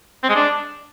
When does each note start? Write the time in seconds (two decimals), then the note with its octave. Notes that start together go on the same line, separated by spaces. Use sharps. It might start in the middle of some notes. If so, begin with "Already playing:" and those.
0.23 C4
0.29 G#3
0.35 D4